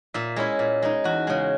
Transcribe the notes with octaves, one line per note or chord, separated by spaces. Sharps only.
A#2 E5
G#3 C#4 E4
A#2
G#3 D#4
E2 F#4
C#3 G#3